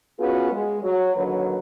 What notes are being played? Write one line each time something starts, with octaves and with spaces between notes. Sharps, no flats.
B3 C#4 F4 F#4 G#4 B4
G#3
F#3
D#2 D3 F#3 A#4 B4 C#5